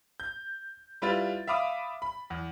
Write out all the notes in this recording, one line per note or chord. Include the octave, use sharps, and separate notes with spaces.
G6
G3 E4 F4 B4 A6
E5 F5 B5 D6 D#6
B5
E2